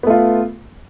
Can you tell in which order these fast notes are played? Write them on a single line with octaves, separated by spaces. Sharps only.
B3 A3 F4